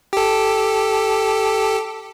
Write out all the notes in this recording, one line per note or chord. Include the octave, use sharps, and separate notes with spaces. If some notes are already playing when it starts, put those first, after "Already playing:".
G4 A4